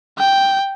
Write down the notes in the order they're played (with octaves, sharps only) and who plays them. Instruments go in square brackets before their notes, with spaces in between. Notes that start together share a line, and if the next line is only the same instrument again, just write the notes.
[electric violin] G5